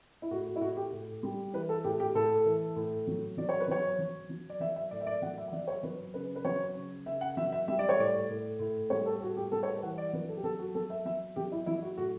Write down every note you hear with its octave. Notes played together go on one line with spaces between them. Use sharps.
E4
A2 F#4
F#4
E4
A2 F#4
G4
A2
G3
E3 B4
A4
A2 G4
G4
A2 A4
E3
A2
F#3
F#3 D5
C#5
B4
F#3 C#5
F#3
F#3
D5
F#3 E5
E5
A2 D5
E5
D5
F#3 F#5
E5
E5
F#3 D5
C#5
F#3 B4
C#3 B4
B4
F#3 C#5
C#3
C#3 E5
F#5
F#3 E5
E5
G3 E5
D5
C#5
A2 D5
A2
A2
G3 C#5
A4
A2 F#4
G4
G3 A4
C#5
B4
E3 F#5
D5
F#3 B4
A4
G4
F#3 A4
F#4
F#3 A4
E5
F#3 E5
F#3 G4
E4
F#3 E4
F#4
A2 F#4